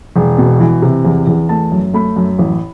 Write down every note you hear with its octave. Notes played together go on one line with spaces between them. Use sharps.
E1
B2
E3
C3
E2
E2
A3 A5
F#2
A3 B5
F#2
A1